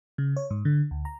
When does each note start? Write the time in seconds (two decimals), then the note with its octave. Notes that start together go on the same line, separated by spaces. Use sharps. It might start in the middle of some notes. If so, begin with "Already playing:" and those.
0.18 C#3
0.37 C#5
0.51 G#2
0.65 D3
0.91 D2
1.05 A#5